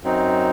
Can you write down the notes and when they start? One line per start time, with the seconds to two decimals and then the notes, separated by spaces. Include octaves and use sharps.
0.03 F#2 F#3 C4 D#4